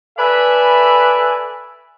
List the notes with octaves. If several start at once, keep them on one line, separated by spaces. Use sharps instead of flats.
A4 B4 D5 E5 G#5 B5